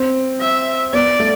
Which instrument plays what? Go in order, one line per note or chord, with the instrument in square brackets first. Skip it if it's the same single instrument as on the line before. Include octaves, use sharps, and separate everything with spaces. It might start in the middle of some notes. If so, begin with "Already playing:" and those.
Already playing: [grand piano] C4
[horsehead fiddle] E5
[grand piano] B3 [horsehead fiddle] D5
[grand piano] A3